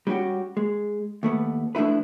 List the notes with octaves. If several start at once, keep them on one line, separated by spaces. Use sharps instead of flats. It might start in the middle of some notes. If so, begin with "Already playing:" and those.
G3 C#4 D4 F#4 G4
G#3
D#2 A3 B3
F3 A3 D4 E4 B4